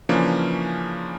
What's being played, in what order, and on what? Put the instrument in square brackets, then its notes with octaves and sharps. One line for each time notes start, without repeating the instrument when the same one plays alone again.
[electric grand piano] C#3 E3 F3 A#3 C#4 D4